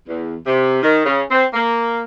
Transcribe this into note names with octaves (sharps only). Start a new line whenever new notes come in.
E2
C3
D#3
C#3
C4
A#3